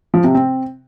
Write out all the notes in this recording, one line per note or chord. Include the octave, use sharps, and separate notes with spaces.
F3
C3
C4